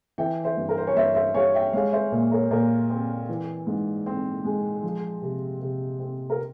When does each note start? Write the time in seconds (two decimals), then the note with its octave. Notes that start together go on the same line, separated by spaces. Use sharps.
0.18 E3 E5 G5
0.44 C5 E5
0.57 G2
0.69 A#4
0.78 C5
0.87 C#5
0.96 G2 C5 E5
1.15 C5 E5
1.34 G3 C#5 F5
1.54 E5 G5
1.73 G#3 C#5 F5
1.92 C5 E5
2.12 A#2
2.31 A#4 C#5
2.51 A#2 A#4
2.90 C4
3.29 E3
3.67 G#2
4.06 C4
4.45 G#3
4.83 F3
5.22 C3
5.61 C3
6.00 C4
6.30 A#4